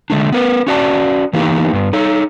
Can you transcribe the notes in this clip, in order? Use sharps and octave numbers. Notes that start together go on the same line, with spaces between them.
D3 G#3 A3 D4
B3 A#4 B4
C#4 F#4 D5 A5
E3 A#3 B3 D#4 G4
G2 B3
D#4 A4 C#5